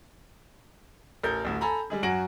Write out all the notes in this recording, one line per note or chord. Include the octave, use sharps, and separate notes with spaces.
A1 A#4 G6
A1 D2
A4 G#5 A#5 B5
G3 G#3 G#4
F#2 F#4 G#5 A#6 D7 F#7